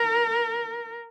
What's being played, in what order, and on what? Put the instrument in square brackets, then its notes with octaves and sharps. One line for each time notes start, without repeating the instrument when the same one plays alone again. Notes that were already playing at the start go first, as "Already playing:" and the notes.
Already playing: [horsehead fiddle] A#4